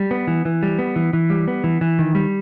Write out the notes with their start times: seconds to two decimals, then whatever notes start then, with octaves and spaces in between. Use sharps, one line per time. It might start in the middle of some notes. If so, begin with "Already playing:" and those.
Already playing: G3
0.11 B3
0.27 E3
0.45 E3
0.63 G3
0.79 B3
0.96 E3
1.13 E3
1.30 G3
1.48 B3
1.64 E3
1.81 E3
1.99 D#3
2.15 G3